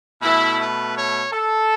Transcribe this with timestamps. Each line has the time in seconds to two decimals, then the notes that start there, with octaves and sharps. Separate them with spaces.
0.22 B2 A3 E4
0.59 B4
0.95 C#5
1.32 A4